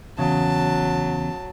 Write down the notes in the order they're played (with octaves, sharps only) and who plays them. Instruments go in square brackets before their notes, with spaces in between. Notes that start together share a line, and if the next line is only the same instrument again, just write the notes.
[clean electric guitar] E2 C#3 [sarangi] F#3 [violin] A5